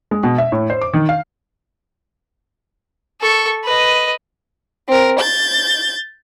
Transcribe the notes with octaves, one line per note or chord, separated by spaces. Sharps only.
G#3
B2
E5
A2
C5
D6
D#3
F5
A4 C#6
B4 D#5
C4 A#4
G6 A6